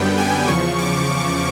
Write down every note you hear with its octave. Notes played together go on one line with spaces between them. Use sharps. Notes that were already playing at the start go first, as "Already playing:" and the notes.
Already playing: F#2 D3 G3 B3 G5
G#5
E2 C#3 F3 C#6
D6